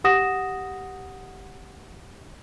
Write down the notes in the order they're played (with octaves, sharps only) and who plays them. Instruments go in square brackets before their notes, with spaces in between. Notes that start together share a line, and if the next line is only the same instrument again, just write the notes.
[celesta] G4 F#5 D#6 A#6 E7